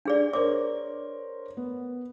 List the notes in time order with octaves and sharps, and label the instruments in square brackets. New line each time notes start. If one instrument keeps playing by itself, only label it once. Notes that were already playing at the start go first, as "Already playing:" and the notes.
[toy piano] D4 G#4 D5
[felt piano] A#4 C5 C#5 [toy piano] D6
[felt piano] B3